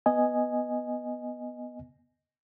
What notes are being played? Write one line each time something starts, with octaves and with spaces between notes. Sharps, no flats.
B3 D#5 G#5